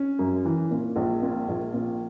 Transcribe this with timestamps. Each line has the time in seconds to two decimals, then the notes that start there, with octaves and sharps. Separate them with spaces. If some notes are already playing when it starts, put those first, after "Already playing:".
Already playing: C#4
0.19 F#2
0.45 E3
0.71 A#2
0.96 A#1
1.23 A#2
1.48 A#1
1.74 A#2